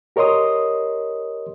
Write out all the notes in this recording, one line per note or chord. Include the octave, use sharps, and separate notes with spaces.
G4 A#4 C#5 D#5 C6 D#6